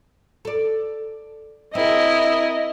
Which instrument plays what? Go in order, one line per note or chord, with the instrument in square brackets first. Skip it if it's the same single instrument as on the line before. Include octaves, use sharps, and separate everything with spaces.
[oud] A4 D5
[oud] C4 G#4 [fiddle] E4 A#4 [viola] D#5